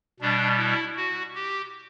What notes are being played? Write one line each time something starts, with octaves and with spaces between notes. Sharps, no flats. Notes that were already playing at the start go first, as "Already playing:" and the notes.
B2 G3 D4
E4
F#4
G4